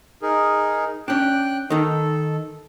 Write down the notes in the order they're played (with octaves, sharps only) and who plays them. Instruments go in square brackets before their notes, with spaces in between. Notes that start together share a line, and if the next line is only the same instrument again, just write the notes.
[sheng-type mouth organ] D#4 G#4 A#4
[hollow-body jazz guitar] C#4 D4 [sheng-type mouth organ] G5 F#6
[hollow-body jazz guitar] D#3 D#4 [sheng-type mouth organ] A4